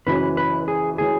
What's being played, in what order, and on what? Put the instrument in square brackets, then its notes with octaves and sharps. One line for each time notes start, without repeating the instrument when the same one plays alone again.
[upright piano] F#1 F#2 E3 C#4 [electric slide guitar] B4
[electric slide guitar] B4
G#4
[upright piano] E3 C#4 [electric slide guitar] G#4